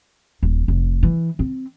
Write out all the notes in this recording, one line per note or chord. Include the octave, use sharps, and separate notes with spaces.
D#1
F1
E3
C4